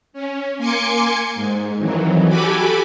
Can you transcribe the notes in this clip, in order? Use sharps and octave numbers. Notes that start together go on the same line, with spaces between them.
C#4
A#3 G#5 C6 D6 C#7
G#2
F2 D#3 E3 F#3
F#4 G4 A4 G#5 B5 D6